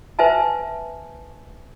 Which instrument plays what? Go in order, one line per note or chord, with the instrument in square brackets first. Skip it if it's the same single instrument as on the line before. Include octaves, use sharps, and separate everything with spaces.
[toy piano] B4 C5 E5 G#5 A5